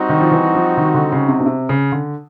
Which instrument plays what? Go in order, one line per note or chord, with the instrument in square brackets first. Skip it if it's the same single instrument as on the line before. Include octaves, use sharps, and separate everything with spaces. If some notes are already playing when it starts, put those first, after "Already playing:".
Already playing: [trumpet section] G3 C4 D#4 F#4
[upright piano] D#3
F3
E3
F3
D#3
D3
C#3
C3
B2
C3
C#3
D3